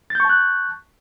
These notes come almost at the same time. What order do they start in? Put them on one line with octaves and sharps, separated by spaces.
A6 G6 C#6 A5 F#6